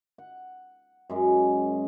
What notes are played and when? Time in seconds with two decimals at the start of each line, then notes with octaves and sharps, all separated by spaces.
0.18 F#5
1.10 F#2 G#3 A#4